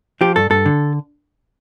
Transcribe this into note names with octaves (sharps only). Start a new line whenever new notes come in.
F3 G4
G2 A4
G2 A4
D3